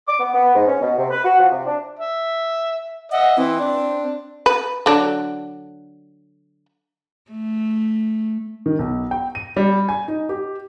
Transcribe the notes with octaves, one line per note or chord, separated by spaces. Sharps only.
D6
B3
B3
G#2
C#4
B2
C3
B4
F#4
F3
C3
D4
E5
D#5 E5 F#5
E3 C4
D4
B4
D3 F#3 D4
A3
D#3
B1
G5
D#7
G3
G#5
D#4
G4